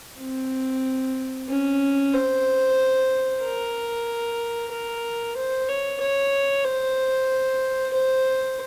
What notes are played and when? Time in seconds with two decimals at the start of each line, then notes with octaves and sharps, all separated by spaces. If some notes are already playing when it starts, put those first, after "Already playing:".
0.20 C4
1.49 C#4
2.14 C5
3.43 A#4
4.72 A#4
5.36 C5
5.69 C#5
6.01 C#5
6.65 C5
7.93 C5